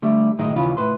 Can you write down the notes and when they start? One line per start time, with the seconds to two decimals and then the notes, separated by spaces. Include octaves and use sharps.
0.02 D3 G3 A3
0.38 B1 A2 D#3 G#3 D#5
0.56 D#2 C#3 E3 C#4 F4 B5
0.77 A2 B4 C6